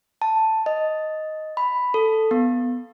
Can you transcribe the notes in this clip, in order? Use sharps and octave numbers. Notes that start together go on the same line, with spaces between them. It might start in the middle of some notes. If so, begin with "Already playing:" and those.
A5
D#5
B5
A4
B3